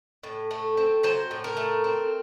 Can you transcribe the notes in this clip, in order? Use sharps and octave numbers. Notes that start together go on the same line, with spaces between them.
A2
A3
C4
F#3 C5
A2
A#4
A3
C4